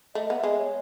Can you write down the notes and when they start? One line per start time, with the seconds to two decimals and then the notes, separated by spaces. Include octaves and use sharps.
0.15 A3 D#5
0.27 D#5
0.30 B3
0.37 E5
0.43 G#3 D#5
0.58 C#5